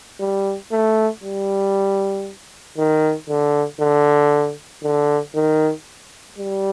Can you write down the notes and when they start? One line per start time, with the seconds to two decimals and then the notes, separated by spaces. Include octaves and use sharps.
0.20 G3
0.72 A3
1.23 G3
2.78 D#3
3.29 D3
3.81 D3
4.83 D3
5.35 D#3
6.38 G3